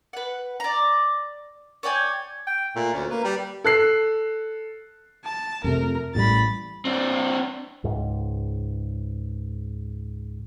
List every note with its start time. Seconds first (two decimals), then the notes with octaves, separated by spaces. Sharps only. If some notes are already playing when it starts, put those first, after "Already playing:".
0.13 B4 F#5
0.60 D5 A#5
1.83 C#5 D5 G5 G#5
2.47 G5
2.76 A#2 A3
2.93 D2 C#4
3.11 A#3 B4
3.24 G3
3.64 A4 F#6 C7
5.25 A5
5.64 F2 C3 A3 A#4
6.15 A1 A2 G3 B5 A6
6.85 C4 D4
7.84 C#2 G#2